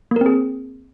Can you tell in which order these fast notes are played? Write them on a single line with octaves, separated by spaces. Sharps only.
A#3 A#4 C4 G#4